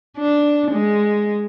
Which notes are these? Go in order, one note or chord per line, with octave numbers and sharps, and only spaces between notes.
D4
G#3